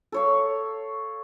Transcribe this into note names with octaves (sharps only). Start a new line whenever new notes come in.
A4 C#5 F5